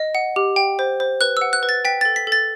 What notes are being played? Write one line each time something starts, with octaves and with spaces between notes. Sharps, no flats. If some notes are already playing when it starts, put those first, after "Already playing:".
Already playing: D#5
F#5
G4
G5
C5
C5
B4 F#6
F#5 E6
F#6
B4
A6
G5 B6
A4 A6
B6
A4 A6